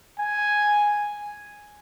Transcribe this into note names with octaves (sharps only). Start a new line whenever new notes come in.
G#5